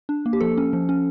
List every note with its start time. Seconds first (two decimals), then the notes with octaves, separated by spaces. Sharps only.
0.09 D4
0.26 A#3
0.33 G4
0.41 F3 A4
0.58 C#4
0.73 F3
0.89 C#4